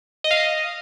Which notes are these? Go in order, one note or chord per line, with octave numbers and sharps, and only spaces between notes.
D#5
F5
D#5